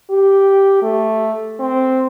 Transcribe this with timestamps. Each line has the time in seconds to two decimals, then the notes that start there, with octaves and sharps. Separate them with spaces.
0.10 G4
0.82 A3
1.60 C4